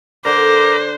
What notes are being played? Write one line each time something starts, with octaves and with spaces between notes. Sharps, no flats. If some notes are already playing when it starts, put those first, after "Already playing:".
D3 A#4 C5 F#5 D6